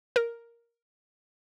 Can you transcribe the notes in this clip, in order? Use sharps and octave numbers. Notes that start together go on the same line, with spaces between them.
A#4